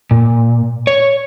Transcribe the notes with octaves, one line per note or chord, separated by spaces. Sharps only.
A#2
C#5